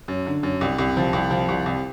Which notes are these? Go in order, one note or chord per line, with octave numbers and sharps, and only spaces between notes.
F#2
D3
F#2
C2
C2
F3
C2
F3
C2
C2